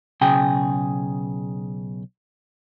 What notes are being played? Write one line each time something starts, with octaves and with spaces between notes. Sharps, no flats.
B1 C#3 G#4 G5